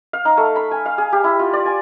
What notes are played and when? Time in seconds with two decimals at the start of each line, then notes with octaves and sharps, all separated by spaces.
0.13 F5
0.25 D#4
0.37 A3
0.56 B5
0.71 G#5
0.86 F5
0.98 G#4
1.12 G4
1.24 E4
1.39 F4
1.53 D5
1.65 G#5